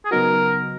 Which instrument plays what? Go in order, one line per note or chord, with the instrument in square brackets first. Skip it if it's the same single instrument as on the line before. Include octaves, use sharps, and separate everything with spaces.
[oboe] G#4
[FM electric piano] C#3 F#3 B3 D#4 F#4 [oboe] A#4